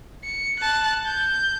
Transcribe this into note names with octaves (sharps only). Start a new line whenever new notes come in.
C#7
A5 F#6
G6